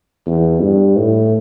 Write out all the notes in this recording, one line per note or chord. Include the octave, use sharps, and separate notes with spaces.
E2
G2
A2